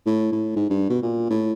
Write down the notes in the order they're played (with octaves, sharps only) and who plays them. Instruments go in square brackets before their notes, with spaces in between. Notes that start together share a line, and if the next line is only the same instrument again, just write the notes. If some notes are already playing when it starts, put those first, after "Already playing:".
[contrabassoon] A2
A2
G#2
G2
B2
A#2
A2